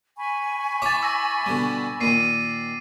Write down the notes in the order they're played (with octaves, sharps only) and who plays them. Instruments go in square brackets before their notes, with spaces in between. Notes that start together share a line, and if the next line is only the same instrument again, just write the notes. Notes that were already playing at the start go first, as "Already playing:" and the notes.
[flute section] G#5 B5 C#6
[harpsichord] E4 C#5 A#5 [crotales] D6 A6
[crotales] E6 A#6
[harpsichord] B2 D3 G3
[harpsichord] A#2 D#3 [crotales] C7 D#7